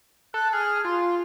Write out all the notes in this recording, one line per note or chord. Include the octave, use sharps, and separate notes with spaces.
A4 F#6
G#4 F6
F4 C6